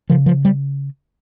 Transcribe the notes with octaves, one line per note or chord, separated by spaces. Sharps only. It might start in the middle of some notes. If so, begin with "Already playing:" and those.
C#3 F3
F3
G3